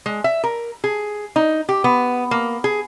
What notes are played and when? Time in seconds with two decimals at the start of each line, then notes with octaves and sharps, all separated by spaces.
0.06 G#3
0.24 E5
0.44 A#4
0.84 G#4
1.36 D#4
1.69 G4
1.84 B3
2.31 A#3
2.64 G#4